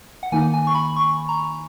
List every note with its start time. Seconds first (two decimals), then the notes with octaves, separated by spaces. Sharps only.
0.23 F#5
0.32 D#3 A#3 D#4 G#5
0.54 G#5
0.67 C#6
0.75 B5
0.96 C#6
1.29 A#5